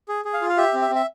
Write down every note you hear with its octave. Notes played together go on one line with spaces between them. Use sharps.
G#4
G#4
F5
F4
F5
G4 E5
C4
E5
C4
E5